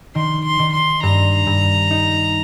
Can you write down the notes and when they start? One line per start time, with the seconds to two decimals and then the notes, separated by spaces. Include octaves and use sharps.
0.15 D#3 C6
0.45 C6
0.59 D#3
0.73 C6
1.03 G2 A#5
1.47 G2
1.91 D#4